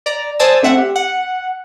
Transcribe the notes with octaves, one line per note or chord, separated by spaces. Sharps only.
D5 A#5
C5 D5 G#5 A5 D#6 E6
A3 C4 E5 F#5
G4
F#5